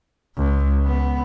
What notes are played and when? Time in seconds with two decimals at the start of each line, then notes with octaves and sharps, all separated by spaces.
0.37 C#2
0.84 B3